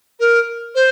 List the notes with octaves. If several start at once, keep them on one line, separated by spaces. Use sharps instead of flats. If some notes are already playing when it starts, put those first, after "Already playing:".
A#4
C5